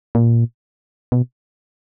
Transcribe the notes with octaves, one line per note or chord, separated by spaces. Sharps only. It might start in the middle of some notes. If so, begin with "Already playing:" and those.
A#2
B2